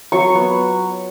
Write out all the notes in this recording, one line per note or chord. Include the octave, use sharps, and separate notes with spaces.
F#3 C#6
B3